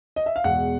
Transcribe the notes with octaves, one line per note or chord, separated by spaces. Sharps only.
D#5
E5
F5
E2 B2 G#3 F#5